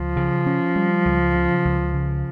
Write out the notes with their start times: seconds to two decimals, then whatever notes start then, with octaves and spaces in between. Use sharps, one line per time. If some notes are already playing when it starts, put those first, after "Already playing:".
Already playing: C#2 F3
0.16 C#3
0.46 C#4
0.76 G3
1.05 C#2
1.36 C#3
1.65 C#2
1.94 C#3